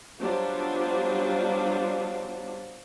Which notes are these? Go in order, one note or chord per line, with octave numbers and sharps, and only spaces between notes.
F#3 G3 B3 D4 F4 C5